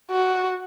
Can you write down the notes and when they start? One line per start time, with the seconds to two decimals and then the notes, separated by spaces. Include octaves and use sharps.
0.11 F#4